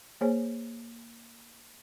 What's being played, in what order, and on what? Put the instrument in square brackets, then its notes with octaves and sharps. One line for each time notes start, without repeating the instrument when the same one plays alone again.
[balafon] A#3 G#4 C5 C#5 G#5